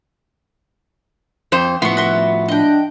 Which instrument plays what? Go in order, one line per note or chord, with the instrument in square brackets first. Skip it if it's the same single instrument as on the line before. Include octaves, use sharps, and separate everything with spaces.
[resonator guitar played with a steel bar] F2 C5
[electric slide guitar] A2 F3 E4 [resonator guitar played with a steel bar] B3 [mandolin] C6 C#6
[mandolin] F#4 E5 C6
[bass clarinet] D4 [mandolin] D#5 G5